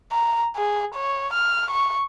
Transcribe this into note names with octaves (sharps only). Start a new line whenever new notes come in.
A#5
G#4
C#5
F6
C#6